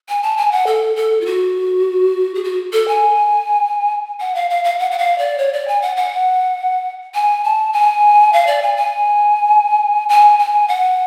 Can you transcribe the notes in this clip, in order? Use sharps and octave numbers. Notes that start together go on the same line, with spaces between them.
G#5
A5
G#5
F#5
A4
A4
F4
F#4
G#4
F#4
A4
G#5
F#5
F5
F5
F5
F#5
F#5
F5
D5
C#5
D5
G#5
F#5
F#5
G#5
A5
G#5
F5
D5
G#5
G#5
G#5
G#5
F#5